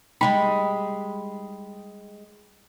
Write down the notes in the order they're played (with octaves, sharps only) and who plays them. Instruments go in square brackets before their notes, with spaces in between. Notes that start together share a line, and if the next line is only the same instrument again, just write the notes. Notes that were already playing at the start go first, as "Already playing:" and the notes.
[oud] G3 G#3 D#4 [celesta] G5 [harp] B5